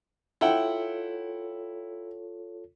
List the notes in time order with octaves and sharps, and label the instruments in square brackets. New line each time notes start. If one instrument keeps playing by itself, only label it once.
[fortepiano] E4 F#5 G5 [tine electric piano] F4 A4 C#5